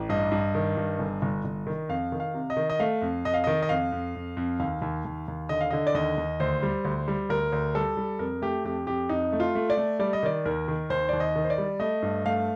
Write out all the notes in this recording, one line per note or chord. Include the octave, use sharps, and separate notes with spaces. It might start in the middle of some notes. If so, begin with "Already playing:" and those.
Already playing: A1
G2 D#5
G2
D#3
G2
G1
G1
G1
D#3
F2 F5
D#3
F5
C3
D#5
D#3
D#5
A3 F5
F2
F2 D#5
F5
D#3 D#5
D#5
F2 F5
F2
F2
F2
D#2 F5
D#2
D#2
D#2
D3 D#5
F5
D3 D#5
D5
D#2 D#5
D#2
D2 C5
G3
D2
G3
D2 A#4
D2
G3 A4
G3
F2 A#4
A3 G4
F2 G4
F2 G4
F2 D#4
A3
F4
A3
D5
A3
G3 D5
D#5
D#3 D5
D#2 A#4
D#3
D#2 C5
D#2 D5
D#5
D#3
C5
D5
G3
A3 D#5
G2
A3 F5